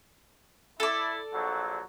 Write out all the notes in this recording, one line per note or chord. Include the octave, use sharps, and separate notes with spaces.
E4 A4 D5
A#1 D3 F#3